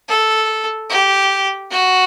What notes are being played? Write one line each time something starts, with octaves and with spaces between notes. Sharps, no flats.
A4
G4
F#4